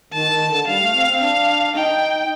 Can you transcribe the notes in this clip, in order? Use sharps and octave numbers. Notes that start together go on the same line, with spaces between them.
D#3 A5
D#3
D3
G3 F5
A3
C4
C4
D4 F5
D#4 G5